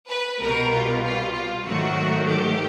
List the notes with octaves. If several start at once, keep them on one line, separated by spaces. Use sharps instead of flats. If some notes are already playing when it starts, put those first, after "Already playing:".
B4
C2 B2 G3 A#4
F4
F4
F4
G#2 D#3 F#3 A3 F#4
G4